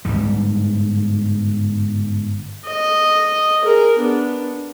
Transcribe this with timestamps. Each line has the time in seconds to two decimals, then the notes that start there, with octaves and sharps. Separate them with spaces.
0.05 G1 D#2 G#2 G3
2.66 D#5
3.63 G#4 A#4
3.98 B3 D4